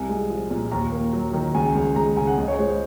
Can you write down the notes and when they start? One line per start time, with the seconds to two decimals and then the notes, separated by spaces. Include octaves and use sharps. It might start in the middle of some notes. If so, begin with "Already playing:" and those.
Already playing: C2 G#5
0.09 G#3
0.30 F3
0.51 A#2
0.72 D#2 A#5
0.92 A#3
1.13 F#3
1.33 D#3
1.55 C#2 G#5
1.75 C#2
1.96 G#3 A#5
2.16 C#3 G#5
2.27 F#5
2.38 C#2 D#5
2.48 C#5
2.59 G#3 C5
2.69 C5